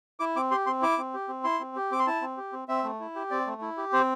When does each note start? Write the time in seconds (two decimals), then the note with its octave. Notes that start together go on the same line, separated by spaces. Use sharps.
0.20 E4 D6
0.36 C4 D6
0.51 G4 C6
0.66 C4 C6
0.82 E4 D6
0.98 C4
1.14 G4
1.28 C4
1.44 E4 C6
1.60 C4
1.76 G4
1.92 C4 D6
1.99 C6
2.07 E4 A5
2.22 C4
2.37 G4
2.53 C4
2.68 C4 E5
2.84 A3
3.00 E4
3.15 G4
3.31 C4 D5
3.47 A3
3.62 E4
3.78 G4
3.93 C4 C5